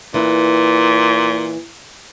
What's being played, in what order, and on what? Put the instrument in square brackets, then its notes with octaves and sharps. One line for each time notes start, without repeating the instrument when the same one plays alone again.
[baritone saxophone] A#2 [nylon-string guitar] E3 E4